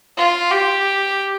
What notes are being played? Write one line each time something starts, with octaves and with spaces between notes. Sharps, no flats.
F4
G4